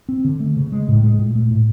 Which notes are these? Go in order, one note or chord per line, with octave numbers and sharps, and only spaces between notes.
C4
D3
A3
C#3
G#3
A2
G#3
A#2
A3
A2